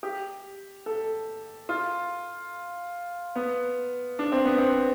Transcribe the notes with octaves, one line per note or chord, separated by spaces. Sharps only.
G4
A4
F4
B3
D4
C4
B3
C4